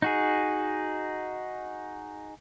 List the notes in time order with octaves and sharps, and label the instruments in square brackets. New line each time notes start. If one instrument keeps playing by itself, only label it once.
[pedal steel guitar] D#4 F#4 G#4